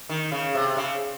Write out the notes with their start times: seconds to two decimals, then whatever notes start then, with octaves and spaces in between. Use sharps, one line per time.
0.09 D#3
0.32 C#3
0.55 C3
0.77 C#3